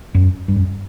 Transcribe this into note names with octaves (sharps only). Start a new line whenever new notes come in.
F#2
G2
F#2